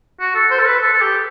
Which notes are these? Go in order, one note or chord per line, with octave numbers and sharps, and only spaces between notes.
F#4
A4
C5
A4
B4
A4
A4
G4